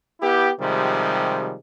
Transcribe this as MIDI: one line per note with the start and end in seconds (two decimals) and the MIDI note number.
0.21 0.50 59
0.21 0.50 64
0.21 0.50 67
0.60 1.54 48
0.60 1.54 51
0.60 1.54 53
0.60 1.54 55
0.60 1.54 56